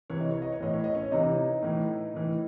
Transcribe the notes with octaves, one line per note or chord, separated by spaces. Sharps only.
C3 E3 C#5
D#5
C#5
D#5
C#5
A2 E3 D#5
C#5
D#5
C#4 C#5
C3 E3 D#4 D#5
A2 E3
A2 E3